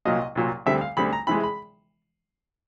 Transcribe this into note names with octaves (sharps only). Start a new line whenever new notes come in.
C2 A#2 F#3 A#3 D#5
C2 A#2 F#3 A#3
D2 D3 G3 C4 E5
F5
D2 D3 G3 C4 B5
A#5
C3 E3 G#3 B5
B5